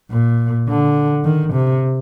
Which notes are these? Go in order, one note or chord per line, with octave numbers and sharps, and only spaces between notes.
A#2
D3
D#3
C3